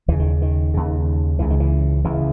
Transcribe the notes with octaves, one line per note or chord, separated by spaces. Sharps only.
D#2 C#3 E3
D#3
D#3
D#2 C#3
C#2 C#3 E3
D#3
E3
C#2 C#3 E3